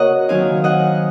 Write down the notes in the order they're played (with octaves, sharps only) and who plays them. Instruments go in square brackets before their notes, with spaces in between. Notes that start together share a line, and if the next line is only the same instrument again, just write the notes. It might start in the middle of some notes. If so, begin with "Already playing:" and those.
Already playing: [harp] C#3 A#3 F#4 A#4 C#5 D#5 F#5
D#3 F#3 C4 D#4 F5 G#5
D#5 F#5